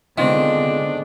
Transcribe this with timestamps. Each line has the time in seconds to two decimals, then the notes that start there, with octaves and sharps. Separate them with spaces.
0.18 D3 D#3 G#3 B3 C4 D4 F4